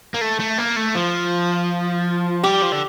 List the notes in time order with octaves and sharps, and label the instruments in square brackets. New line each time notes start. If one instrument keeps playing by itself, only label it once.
[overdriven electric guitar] A#3
A3
A3
A#3
A3
F3
[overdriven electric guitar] G3 [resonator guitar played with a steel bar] G4
[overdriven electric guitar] F3
D3